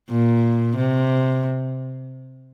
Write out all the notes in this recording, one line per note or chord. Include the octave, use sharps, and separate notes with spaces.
A#2
C3